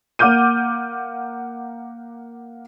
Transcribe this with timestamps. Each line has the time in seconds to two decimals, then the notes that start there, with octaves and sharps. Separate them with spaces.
0.19 A#3 F#5 D6 F6 G6 D#7